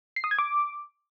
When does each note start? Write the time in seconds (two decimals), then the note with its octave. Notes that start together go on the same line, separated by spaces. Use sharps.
0.16 C7
0.24 D#6
0.31 G#6
0.39 D6